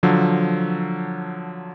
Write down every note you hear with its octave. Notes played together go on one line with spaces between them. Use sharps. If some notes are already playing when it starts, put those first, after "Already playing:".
D3 F3 F#3